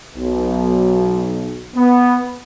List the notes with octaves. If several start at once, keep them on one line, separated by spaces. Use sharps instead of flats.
B1
B3